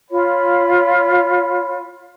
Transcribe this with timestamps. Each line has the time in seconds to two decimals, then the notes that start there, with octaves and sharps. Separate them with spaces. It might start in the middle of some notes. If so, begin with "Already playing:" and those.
0.11 F4 C#5 B5